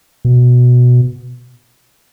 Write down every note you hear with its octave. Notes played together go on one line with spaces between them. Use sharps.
B2